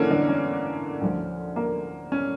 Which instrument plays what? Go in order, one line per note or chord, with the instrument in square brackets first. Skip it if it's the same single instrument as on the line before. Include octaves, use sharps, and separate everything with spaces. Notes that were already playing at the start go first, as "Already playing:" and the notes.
Already playing: [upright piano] D3 E3 A#3 C#4 D4 A4
D3 D4
C#4
D2 D3 F3
A#3
C#4